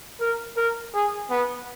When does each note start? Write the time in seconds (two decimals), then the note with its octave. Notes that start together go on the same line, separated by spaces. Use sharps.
0.21 A#4
0.57 A#4
0.95 G#4
1.31 B3